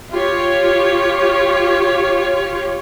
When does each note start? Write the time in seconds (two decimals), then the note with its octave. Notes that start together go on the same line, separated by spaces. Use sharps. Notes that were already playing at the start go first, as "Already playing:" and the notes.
0.12 F4 G4 C#5